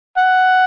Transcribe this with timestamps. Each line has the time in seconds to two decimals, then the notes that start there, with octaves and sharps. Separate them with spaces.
0.17 F#5